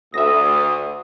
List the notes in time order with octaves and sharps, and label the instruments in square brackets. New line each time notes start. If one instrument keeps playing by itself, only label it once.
[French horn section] D2 [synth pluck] E5 A#6 [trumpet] D#6